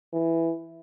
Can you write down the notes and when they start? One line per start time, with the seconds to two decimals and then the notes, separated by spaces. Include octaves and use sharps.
0.13 E3